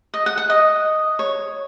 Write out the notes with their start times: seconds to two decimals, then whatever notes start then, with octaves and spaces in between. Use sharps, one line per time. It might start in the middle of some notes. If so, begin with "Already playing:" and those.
0.14 D#5
0.26 F#5
0.37 F#5
0.50 D#5
1.19 C#5